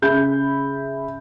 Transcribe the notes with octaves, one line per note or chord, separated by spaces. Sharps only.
C#3 G#4 E5 B5 G6